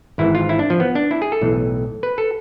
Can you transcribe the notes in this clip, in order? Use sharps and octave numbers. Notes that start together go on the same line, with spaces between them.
G#1 G#2 E3 E4
F4
E4
D4
F3
B3
D4
E4
G#4
A4
B1 A2 E3
B4
A4